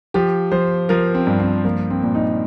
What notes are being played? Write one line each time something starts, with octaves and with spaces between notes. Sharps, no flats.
F3 G4
F3 C5
F3 A#4
C4
G2
C4
F3 A#3
C4
A#2
D#4